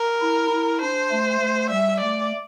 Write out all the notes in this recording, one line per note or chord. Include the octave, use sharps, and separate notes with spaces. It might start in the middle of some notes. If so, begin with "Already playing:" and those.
Already playing: A#4
E4
E4
D4 C5
A3
A3
G3 E5
A3 D5